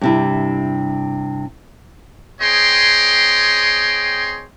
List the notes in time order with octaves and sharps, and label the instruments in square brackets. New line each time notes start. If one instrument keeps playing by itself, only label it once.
[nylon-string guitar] G2 C3 E4
[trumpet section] C4 G#4 C#5 D#5 G5 C6